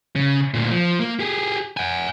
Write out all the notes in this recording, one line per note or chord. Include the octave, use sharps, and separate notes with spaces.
C#3
D2 A#2
F3
A#3
G4 G#4
F#5 G#5